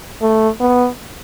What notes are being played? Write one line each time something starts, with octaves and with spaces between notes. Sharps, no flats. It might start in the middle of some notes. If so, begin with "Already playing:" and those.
A3
B3